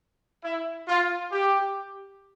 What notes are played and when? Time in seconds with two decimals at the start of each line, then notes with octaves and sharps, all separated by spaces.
0.43 E4
0.88 F4
1.32 G4